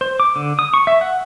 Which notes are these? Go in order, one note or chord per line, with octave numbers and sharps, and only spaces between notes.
C5
D6
D3
D#6
C#6
E5
F#5